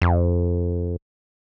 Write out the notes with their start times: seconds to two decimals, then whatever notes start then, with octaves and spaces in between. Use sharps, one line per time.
0.02 F2